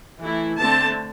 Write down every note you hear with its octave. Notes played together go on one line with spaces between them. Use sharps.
E3 A3 E4
D3 A3 C4 A5